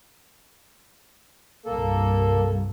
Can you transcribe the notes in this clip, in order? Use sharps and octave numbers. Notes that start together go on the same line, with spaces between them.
C2 G2 A#3 A4